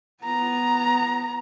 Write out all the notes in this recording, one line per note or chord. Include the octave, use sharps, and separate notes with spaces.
B3 A#5